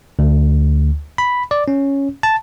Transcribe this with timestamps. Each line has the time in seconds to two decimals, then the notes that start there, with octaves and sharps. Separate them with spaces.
0.19 D2
1.18 B5
1.51 D5
1.68 C#4
2.23 A5